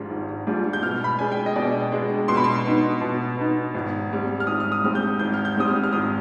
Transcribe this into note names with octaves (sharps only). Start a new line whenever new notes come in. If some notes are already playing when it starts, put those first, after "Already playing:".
Already playing: G#1 G#2 G3 D4 F4
G#1
G#2 G3 D4 F4
G6
B2 F6
B5
G#3 D4 G#5
G5
D#5
B2 D5
G#3 D4
B2 C6
B5
C6
B3 D#4
B2
B3 D#4
G#1
G#2 G3 C4
F6
G#1 D#6
F6
D#6
G#2 G3 C4 F6
G6
G#1 G6
F6
G6
G#2 G3 C4 D#6
F6
F6
G#1 D#6